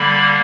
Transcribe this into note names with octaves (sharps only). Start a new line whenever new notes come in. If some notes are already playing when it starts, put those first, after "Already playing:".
Already playing: D3 G3 A#3 B5